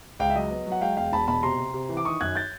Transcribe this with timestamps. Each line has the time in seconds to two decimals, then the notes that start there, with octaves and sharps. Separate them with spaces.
0.19 C#2 F5 G5
0.30 E5
0.35 F#3 D#5
0.51 B3
0.66 F#3
0.72 F#5
0.81 G#3 F5 G5
0.97 E1 F5 G5
1.12 E1 A5 B5
1.28 B2 A5 B5
1.43 C3 A#5 C6
1.59 C3
1.74 C3
1.89 E3
1.97 D6
2.05 D#3 C#6 D#6
2.21 F#2 F#6 G#6
2.35 G6 A6